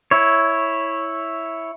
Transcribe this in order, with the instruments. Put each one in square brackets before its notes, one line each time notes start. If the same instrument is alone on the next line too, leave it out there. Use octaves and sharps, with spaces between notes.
[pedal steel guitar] E4 C#5